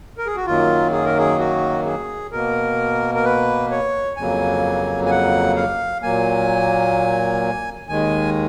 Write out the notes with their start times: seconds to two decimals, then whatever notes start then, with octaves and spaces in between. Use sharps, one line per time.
0.18 A#4
0.26 G#4
0.36 F#4
0.46 F#2 D#3 F#3 A#3 F4
0.92 G#4
1.05 A#4
1.18 G#4
1.39 F#4
1.85 G#4
2.31 B2 A#3 A#4
3.15 A#4
3.24 B4
3.71 C#5
4.17 F2 C#3 F#3 A#3 G#5
5.06 G#5
5.11 F#5
5.56 F5
6.02 A#2 F#3 A#3 G#5
7.87 D#2 D#3 G#3 G#5